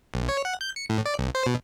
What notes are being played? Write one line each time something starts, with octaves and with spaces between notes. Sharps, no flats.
B1
C#5
F#5
G6
C#7
A2
D5
C2
C5
B2